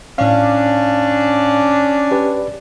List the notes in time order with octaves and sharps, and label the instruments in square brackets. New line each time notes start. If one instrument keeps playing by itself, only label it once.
[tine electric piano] A2 F5 [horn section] C#4 D4
[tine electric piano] G4 B4 D5